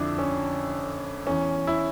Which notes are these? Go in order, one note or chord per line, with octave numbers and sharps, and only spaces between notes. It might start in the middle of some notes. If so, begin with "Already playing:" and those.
Already playing: F2 D3 D4 E4
C#4
E2 E3 C#4
E4